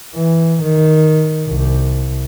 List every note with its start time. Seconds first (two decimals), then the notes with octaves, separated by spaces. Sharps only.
0.15 E3
0.63 D#3
1.48 C2